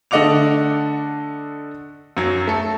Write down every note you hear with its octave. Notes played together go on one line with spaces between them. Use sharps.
D3 A3 D#5 F#5 D6 F7
F#2 F#3
A3 A4